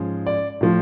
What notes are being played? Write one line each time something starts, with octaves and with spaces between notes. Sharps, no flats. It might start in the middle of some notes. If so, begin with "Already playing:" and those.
Already playing: G#2 F3 G#3 C#4
D5
A2 F3